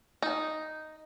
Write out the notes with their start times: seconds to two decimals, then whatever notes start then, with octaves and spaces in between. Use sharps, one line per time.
0.22 D#4